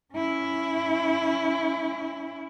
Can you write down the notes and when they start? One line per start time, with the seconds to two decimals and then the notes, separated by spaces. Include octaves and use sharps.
0.14 C#4 E4